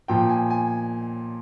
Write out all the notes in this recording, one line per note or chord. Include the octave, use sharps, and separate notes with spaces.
A#2 F3 G5
G#5
G#5